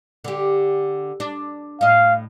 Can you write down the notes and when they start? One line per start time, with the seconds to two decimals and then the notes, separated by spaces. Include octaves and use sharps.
0.24 D3 G4
1.20 D4
1.81 A2 D#5 F5